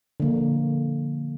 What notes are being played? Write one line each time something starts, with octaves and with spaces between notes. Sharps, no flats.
D3 F3 A#3